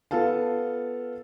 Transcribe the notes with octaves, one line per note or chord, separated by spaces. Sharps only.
B3 F4 A4 F5 A5